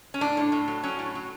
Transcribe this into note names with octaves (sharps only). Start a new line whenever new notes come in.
C#4
A2 D4
A2
A2
F#3
F#3 C#4
A2
F#3